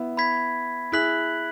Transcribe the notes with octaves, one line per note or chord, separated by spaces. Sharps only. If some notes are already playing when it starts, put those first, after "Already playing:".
Already playing: B3 E4
B5 G#6 B6
E4 G#4 F#6 B6 F#7